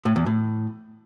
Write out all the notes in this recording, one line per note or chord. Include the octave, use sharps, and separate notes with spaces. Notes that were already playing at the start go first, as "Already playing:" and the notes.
A2
E2
A2